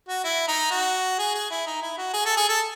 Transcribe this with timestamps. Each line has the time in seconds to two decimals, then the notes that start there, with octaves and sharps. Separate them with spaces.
0.09 F#4
0.24 E4
0.48 D#4
0.71 F#4
1.19 G#4
1.35 G#4
1.51 E4
1.67 D#4
1.82 E4
1.98 F#4
2.14 G#4
2.26 A4
2.37 G#4
2.49 A4